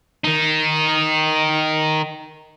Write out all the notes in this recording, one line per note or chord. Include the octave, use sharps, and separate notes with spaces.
D#3 D#4